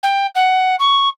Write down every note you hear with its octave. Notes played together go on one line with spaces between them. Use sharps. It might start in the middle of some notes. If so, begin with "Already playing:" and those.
G5
F#5
C#6